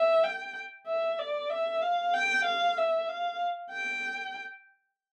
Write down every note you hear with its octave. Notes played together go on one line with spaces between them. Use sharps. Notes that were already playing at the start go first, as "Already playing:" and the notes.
Already playing: E5
G5
E5
D5
E5
F5
G5
F5
E5
F5
G5